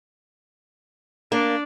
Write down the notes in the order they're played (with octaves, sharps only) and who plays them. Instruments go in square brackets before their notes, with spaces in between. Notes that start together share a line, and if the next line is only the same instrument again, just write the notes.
[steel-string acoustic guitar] A#3 [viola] D4 D5